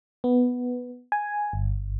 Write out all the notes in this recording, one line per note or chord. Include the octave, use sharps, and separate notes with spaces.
B3
G#5
G1